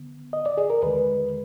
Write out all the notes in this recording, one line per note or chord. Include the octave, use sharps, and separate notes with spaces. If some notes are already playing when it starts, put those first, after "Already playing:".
Already playing: D3 B3
D#5
D5
G#4
A#4
D#2 D3 G#3 B4